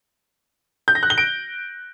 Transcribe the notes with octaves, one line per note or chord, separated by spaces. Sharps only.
G6
A#6
F#6
G7
D7